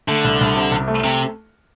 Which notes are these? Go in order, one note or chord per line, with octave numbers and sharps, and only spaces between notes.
D3 A3
C2
C2
C3
C2
A3
C3